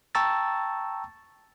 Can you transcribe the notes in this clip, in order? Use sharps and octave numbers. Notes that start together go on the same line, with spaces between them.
G5 A5 A#5 C#6 E6 A6